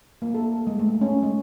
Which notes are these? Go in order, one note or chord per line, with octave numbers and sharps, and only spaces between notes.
A#3
A4
G#3
A3
C#4
G#3